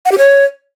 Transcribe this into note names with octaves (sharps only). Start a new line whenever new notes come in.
F#5
G4
C#5